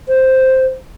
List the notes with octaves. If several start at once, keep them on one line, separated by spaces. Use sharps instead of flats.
C5